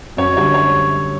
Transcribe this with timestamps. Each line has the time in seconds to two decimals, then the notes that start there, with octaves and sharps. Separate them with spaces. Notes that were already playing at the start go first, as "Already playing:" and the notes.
0.17 F#2 C#5
0.37 D3 G3 C#5
0.54 C#5